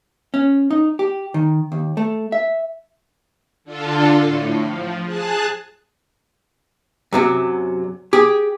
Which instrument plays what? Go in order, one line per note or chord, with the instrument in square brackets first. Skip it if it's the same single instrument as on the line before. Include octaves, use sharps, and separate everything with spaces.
[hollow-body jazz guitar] C#4
D#4
G4
D#3
D#2
A3
E5
[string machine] D3 D4 F4 A4
A2
F3
G#4 A5 F#6
[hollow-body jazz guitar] F#2 C3 F#3
G4 G#4